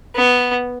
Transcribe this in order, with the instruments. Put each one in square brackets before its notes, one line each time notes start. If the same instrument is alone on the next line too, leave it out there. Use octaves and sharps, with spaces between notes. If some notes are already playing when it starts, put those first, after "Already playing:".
[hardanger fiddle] B3